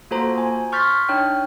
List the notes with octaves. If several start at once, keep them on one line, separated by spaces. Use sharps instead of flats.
A#3 F4 F#4 A4 C5 A#5
G#5
C6 C#6 F6 G6 A6 B6
D4 D#4 C#5 G5 F6